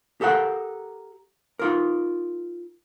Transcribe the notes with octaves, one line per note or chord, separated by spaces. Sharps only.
G4 A4 A#4 F#5
D#4 F4 A#4